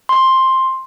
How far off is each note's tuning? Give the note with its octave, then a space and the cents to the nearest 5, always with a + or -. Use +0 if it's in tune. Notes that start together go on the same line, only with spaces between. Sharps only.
C6 +10